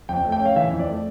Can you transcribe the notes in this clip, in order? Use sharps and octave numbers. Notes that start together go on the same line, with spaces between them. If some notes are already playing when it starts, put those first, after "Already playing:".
F2 G5
A3
G5
C#4
F5
E3 E5
F2
D5
A3